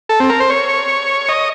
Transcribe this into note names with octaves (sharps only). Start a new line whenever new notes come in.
A4
C4
A#4
C5
C#5
D#5